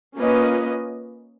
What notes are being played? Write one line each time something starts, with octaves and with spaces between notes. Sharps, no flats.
A#3 C#4 F4 B4 D#5